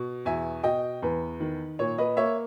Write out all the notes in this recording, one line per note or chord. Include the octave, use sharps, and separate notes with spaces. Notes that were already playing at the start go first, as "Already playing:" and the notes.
Already playing: B2
E2 E5 G#5
B2 D#5 G5
E2 B4
D#3
A#2 C#5
B4 D#5
A#3 C#5 E5